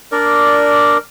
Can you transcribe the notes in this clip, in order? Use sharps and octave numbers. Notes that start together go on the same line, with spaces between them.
D4 A#4 D5